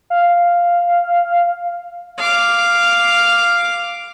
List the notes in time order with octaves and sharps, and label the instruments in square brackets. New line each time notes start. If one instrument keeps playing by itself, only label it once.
[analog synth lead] F5
[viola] F5 D6